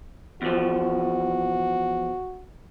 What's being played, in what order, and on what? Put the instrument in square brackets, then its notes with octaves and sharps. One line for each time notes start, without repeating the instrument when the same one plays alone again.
[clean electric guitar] E2 F3 [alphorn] F#4